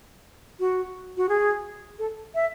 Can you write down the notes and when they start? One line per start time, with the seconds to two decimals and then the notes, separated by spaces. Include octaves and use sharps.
0.60 F#4
1.17 F#4
1.29 G#4
1.99 A4
2.35 E5